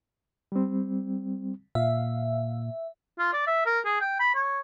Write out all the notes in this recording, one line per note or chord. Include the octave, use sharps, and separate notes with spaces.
G3 C4
A#2 E5 F5
F4
D5
E5
A#4
G#4
G5
B5
C#5